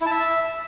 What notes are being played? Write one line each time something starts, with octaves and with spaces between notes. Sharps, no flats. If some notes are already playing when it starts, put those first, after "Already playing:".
E4
A5
E5